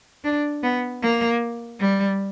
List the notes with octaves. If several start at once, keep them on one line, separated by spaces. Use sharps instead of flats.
D4
B3
A#3
G3